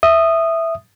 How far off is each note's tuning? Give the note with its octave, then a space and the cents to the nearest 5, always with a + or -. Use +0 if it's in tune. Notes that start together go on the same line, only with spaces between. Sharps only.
E5 +0 D#6 -10